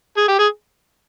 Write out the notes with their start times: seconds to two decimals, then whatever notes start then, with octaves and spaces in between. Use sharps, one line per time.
0.17 G#4
0.28 G4
0.39 G#4